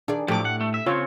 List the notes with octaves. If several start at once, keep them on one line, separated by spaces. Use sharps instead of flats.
D#3 D4 G#4 D5
A2 F3 F#3 G4 A4 D6
F#5
A3
E5
C#3 C4 F4 C#5